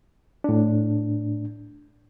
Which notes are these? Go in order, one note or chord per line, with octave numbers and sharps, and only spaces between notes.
A2 D4